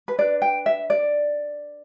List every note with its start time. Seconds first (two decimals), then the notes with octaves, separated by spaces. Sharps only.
0.08 B4
0.18 D4 B4 D5
0.42 G5
0.66 E5
0.90 D5